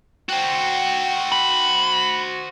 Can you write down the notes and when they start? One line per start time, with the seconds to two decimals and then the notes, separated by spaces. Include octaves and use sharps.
0.29 F#4 C5 G5
1.32 B5